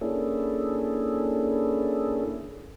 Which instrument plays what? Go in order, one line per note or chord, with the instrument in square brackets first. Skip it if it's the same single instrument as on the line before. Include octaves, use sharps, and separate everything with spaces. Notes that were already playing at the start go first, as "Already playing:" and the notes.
[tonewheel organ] A#3 C#4 D4 E4 G#4 A4